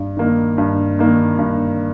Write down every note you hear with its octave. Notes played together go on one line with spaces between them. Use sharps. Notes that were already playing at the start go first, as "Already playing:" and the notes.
Already playing: G2
D#3 A#3 D#4
G2
D#3 A#3 D#4
G2